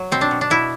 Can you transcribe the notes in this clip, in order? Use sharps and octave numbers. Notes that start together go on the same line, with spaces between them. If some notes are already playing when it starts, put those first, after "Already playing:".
Already playing: F#3
B2 C4
D4
B2
D4
B2 E4